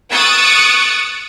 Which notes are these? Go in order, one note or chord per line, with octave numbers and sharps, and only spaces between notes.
C#6 D#6 E6 F#6 A6 D7